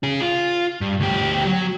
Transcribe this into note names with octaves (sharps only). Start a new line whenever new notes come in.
C#4 G#4
F4
G2
D2 G4
F#3